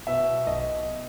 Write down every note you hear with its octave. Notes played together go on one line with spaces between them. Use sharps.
B2 E5
B1 D#5